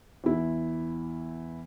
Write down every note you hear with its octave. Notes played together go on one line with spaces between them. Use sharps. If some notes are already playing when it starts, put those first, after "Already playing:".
E2 E4